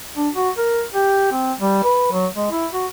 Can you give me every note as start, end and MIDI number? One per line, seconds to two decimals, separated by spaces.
0.16 0.29 62
0.34 0.50 66
0.57 0.82 70
0.93 1.29 67
1.31 1.53 60
1.60 1.79 55
1.84 2.10 71
2.12 2.27 54
2.36 2.48 56
2.51 2.66 64
2.72 2.86 66